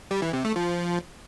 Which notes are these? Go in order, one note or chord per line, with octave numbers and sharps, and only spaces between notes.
G3
E3
C3
A3
F3